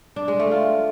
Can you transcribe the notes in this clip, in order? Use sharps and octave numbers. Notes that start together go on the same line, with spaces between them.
D4
G#3
A3
F4